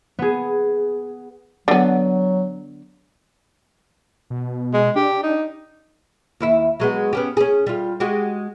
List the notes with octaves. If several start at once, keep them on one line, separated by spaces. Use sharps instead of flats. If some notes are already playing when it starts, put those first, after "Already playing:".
B3 G#4
D3 F#3 B3
B2
G#3
D4 G4
D#4
D#2 E4 E5
F#3 G#3 B3
B3 C#4 G4
C#4 G#4
G3 F4
G#3 F#4 G4